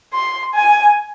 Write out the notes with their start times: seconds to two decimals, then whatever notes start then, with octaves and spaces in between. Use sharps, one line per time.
0.14 C6
0.55 G#5